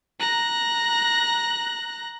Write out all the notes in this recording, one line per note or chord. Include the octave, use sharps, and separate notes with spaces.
A#5 F#6